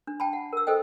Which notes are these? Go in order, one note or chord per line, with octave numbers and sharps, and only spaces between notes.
D4
G5 A5 B5
F#5
A#4 E6
A4 C5 D#5 G5